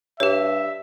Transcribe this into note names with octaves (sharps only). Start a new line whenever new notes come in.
G2 G4 C#5 E5